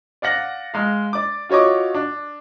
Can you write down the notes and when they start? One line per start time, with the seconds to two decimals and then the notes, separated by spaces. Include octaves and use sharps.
0.22 D5 F5 F#5 A#6 F#7
0.74 G#3 F5
1.13 D5 D6
1.49 F4 F#4 C#5 D#5 D6
1.94 D4